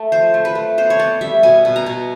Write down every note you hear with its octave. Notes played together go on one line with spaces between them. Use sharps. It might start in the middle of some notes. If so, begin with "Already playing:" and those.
Already playing: A3
F3 C5
A3
B4
A3
B3 C5
C#5
B3 D5
G3 E5
B2 G#5
B2
A#5
B2